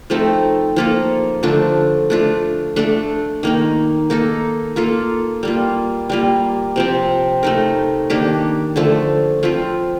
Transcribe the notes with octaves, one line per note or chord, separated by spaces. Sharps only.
F3 A3 C4 D#4
F3 A#3 F4 A4
D3 F3 A3 D4
A3 D4 F4
A3 D4 A4
D#3 A#3 D#4
A#3 D#4 A4
A#3 F4 A4
G3 A#3 F4
G3 A#3 F4
C3 F3 C4
A3 D#4 A#4
D#3 A#3 D4 G4
D3 F3 A3
F3 C4 F4